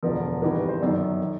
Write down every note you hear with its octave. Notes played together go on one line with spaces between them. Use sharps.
E1 D2 D3 F3 A#4
G#1 G2 E3 A#4
B4
C5
G1 F#2 D#3 D5
D#3